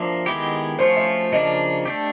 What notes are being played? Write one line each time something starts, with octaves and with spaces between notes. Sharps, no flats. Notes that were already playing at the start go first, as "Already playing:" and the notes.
Already playing: F3 A#3 D4 E5
D#3 G#3 B3 E4 G4
F3 A3 C#4 F4 C5
E5
C#3 F3 A#3 D4 D#5
A3 D4 G4